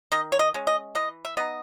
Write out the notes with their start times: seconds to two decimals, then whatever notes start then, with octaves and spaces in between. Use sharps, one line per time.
0.12 D#3 D#5
0.32 C#5
0.39 D#5
0.54 G#3 C#4
0.67 D#5
0.95 E3 D#5
1.25 E5
1.37 B3 D#4 D#5